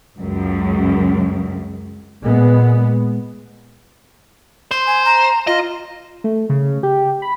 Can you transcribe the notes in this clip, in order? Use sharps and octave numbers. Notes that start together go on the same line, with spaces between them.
C#2 F#2
A#2 G#3 B3
C5 C6
G#5
A#5
F4 D#5
A3
C#3
G4
B5